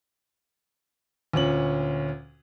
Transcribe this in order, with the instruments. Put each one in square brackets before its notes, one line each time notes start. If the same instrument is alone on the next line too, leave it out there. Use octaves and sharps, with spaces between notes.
[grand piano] D2 A#2 C#4 F#7